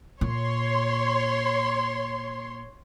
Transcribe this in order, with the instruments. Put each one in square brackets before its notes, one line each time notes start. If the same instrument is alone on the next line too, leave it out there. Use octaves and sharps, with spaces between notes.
[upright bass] A#2 [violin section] C#5 C6